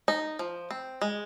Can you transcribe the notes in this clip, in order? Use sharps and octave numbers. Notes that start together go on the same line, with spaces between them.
D#4
F3
C4
G#3